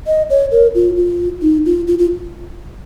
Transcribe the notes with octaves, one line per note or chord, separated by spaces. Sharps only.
D#5
C#5
A#4
F4
F4
D#4
F4
F4
F4